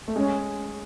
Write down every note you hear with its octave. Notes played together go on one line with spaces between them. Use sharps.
A3
G#3 C#4